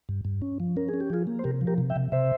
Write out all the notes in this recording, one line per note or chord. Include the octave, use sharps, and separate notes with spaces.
G2
G2
C#4
F3
C#4 A#4
G#4
C#4
G4
F3 F4 G#4
A#3
C5
C3 G4 A#4
F3
G4 A#4
C3
E5 G5
C3
C3 C5 E5